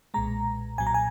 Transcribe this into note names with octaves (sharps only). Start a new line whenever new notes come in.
B1 A#2 G#3 A#5
B1 A#2 F#3 G#5
A#5
G#5